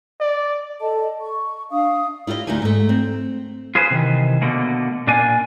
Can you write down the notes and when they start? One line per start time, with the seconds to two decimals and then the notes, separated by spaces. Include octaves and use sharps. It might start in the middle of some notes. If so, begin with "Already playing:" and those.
0.20 D5
0.79 A4 D#5 A5
1.21 C#6
1.71 D4 E5 F5 D#6
2.27 E4 F4 G4 B4 D#5
2.47 D2 D#4 E4 G4 G#5
2.62 G#2 A3
2.89 C4
3.75 F4 G#4 B4 C5
3.91 C3 D#3 E3
4.42 B2 D3 A3 A#3
5.07 A#2 D4 F4 G#5